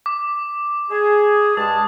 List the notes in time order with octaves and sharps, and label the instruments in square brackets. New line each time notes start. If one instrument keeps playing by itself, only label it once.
[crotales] D6
[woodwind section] G#4
[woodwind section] G2 G#3 A5 [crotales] D#6